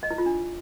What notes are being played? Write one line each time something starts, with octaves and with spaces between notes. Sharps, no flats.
D#5
E4
F4
D4